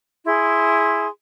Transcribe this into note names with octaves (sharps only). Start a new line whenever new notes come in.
E4 G#4 C6